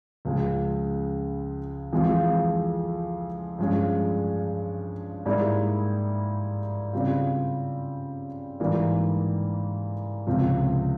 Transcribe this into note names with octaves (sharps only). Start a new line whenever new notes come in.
C#2 C#3 F3 G#3
F2 E3 G#3 C4 F4
G2 F3 G#3 C#4
G#2 G3 A#3 E4 G#4
C#3 G3 C4 F4
G#2 E3 G3 A#3
C#2 C3 F3 C4